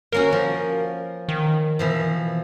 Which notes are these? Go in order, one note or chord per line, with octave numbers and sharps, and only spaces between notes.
A#3 C#4 F#4 A#4
F3
D#3
B2 E3 F3